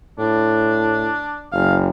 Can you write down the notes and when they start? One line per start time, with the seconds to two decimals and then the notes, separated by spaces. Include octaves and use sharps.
0.19 A2 D4
1.52 F#1 F5